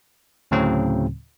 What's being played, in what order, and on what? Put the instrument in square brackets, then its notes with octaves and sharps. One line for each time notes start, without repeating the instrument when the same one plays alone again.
[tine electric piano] D2 A2 C#3 F#3 C4